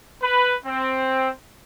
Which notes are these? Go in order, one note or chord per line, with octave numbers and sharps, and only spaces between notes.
B4
C4